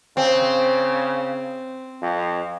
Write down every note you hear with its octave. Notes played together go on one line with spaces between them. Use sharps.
C#3 C4
F2